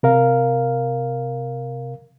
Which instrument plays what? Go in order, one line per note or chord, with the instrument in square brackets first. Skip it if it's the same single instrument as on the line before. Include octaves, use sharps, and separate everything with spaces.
[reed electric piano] C3 A#4 F5